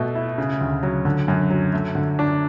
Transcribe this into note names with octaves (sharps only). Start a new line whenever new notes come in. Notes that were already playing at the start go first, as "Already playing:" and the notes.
Already playing: B2 A3
E4
C#3
D2
F#3
D3
F#2
F#3
A3
D3
D4